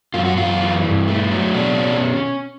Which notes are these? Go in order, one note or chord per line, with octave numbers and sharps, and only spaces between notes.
F#2 F4
F#4
F#2 F4
E3
G2
A3
F#3
B2 D4
C#4